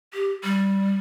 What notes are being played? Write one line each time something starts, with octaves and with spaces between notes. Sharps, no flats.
G4
G3